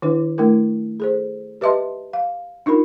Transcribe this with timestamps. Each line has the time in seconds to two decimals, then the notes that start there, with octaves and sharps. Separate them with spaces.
0.02 D#3 D4 E4 B4
0.38 A3 D4 E4 A#4
1.00 G#4 A4 C5
1.61 G4 B4 D#5 E5 A5 C6
2.13 F5
2.66 D4 D#4 F4 A#4 B5